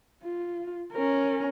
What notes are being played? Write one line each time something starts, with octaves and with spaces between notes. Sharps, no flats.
F4
C#4 A#4